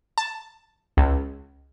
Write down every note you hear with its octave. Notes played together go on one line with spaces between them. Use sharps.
A5
C#2